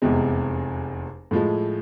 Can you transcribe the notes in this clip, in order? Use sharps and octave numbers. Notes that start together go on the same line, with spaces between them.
F1 E2 C3 G#3
A2 F3 G#3